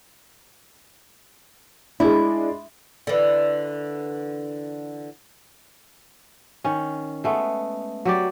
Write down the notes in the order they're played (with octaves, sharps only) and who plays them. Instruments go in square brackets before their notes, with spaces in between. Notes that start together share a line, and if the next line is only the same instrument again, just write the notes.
[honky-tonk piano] G#3 D4 [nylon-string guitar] E4
[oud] D3 E3
[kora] D#3 C#4
G#3 A3 B3
F#3 G4 D5